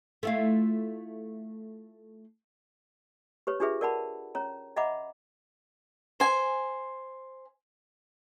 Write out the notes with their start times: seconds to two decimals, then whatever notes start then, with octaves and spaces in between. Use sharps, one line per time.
0.23 A3 E4 F4
3.47 G4 B4 C#5
3.60 D4 F4 G4 G#4 B4 E5
3.81 A#4 D5 F#5 A5 B5
4.35 C#4 C#5 A#5
4.76 D#5 E5 F#5 A#5 B5 D6
6.20 C5 G#5